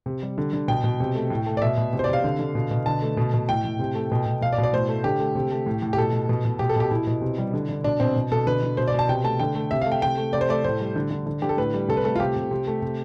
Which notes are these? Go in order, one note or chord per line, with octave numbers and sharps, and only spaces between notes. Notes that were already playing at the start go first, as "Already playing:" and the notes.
C3
G3
D3
D3
B2 G5
B2
C3
A3
A2
A3
D5
B2 E5
B2
C3
C5
D5
C3 F5
D3
D3
B2
B2
D3 A5
A3
B2
B2
A2 G5
A2
C3
A3
B2
B2
B2 F5
D5
B2
D5
A2 C5
A3
D3 G4
A3
C3
A3
A2
A2
G4
B2 A4
B2
B2
B2
B2 G4
A4
B2 G4
B2 E4
B2
C3
G3
D3
D3
B2 D4
B2 C4
B2
B2 A4
D3 B4
D3
B2 C5
D5
B2 A5
C3 G5
A3 A5
D3 G5
A3
C3 E5
F5
A3
G5
C3 G5
A3
C3 D5
C5
A3 D5
A2 C5
G3
D3
D3
D3
D3 G4
A4
A2 B4
G3
C3 A4
B4
A3 A4
F4
C3 G4
C3
C3
A3
C3